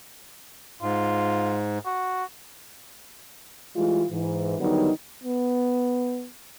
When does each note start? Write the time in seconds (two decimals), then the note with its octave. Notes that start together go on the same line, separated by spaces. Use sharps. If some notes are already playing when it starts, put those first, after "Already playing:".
0.82 G#2 F4
1.85 F#4
3.76 E3 G3 G#3 F4
4.10 G#2 E3
4.59 D3 D#3 F#3 G3 B3 D#4
5.23 B3